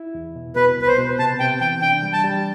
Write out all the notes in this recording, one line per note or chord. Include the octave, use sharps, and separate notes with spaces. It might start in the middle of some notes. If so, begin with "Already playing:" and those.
Already playing: E4
E2
B2
B2 B4
C2 B4
C5
B2
C3 A5
C3 G5
E3 G5
D4 G5
G3
A5
G3